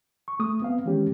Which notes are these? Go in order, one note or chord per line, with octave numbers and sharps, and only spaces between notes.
C#6
A3 D#6
B3 C4 F5
D#3 E3 G#3 C#4 G4